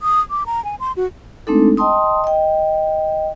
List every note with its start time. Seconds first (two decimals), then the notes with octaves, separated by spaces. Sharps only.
0.02 D#6
0.30 D6
0.46 A#5
0.64 G#5
0.80 C6
0.96 F#4
1.47 G#3 A3 C4 D4 D#4 A4
1.77 D#5 G5 A5 C6 D#6
2.24 D#5 G5